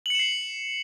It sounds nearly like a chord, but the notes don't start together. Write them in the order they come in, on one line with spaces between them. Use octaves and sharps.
F#7 C#7 E7 C7